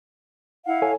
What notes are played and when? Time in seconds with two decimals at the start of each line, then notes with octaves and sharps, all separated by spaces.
0.66 E4 F5 F#5
0.82 A4 C#5 G#5